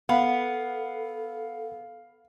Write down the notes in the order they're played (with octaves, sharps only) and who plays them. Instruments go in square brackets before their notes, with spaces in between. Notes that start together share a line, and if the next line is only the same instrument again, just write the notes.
[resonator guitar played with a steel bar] B3 [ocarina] A4 [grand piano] F5 [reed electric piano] F#5 B5